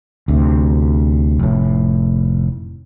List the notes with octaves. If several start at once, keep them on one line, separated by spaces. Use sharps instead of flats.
D2 C3
F1 A2